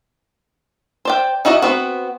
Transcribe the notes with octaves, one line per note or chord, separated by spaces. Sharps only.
C5 D5 G5
D#4 E4 F#4 D5 D#5
B3 C4 F#4